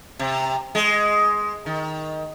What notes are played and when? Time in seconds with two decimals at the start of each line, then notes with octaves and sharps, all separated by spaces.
0.19 C3
0.75 G#3
1.66 D#3